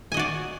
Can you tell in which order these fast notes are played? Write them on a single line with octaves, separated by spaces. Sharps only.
G#5 D#5 F#4 D5